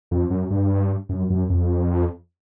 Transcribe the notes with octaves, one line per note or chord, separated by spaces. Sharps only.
F2
F#2
G2
F#2
F#2
F2